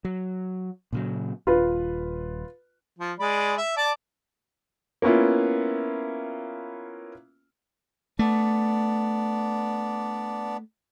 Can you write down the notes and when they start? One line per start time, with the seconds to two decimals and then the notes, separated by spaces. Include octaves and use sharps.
0.05 F#3
0.93 A#2 C#3 F#3
1.47 D#1 F4 B4
2.99 F3
3.20 G#3 D5 B5
3.57 E5
3.77 D5 A5 D6
5.02 A#3 B3 C#4 E4 F4
8.19 A3 B3 D4 D5